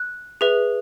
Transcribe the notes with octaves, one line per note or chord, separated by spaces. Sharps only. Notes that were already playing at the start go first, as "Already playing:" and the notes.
Already playing: F#6
G#4 B4 E5